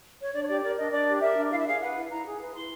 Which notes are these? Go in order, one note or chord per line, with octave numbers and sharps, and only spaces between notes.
C#5
D4 D5
C#5
G4 D5
A#4 D5
D4 D#5
D4 D5
G4
A#4 E5
D4
E4 F5
E5
G#4 F5
B4 F#5
E4
E4 A#5
G#4
B4
E4 C6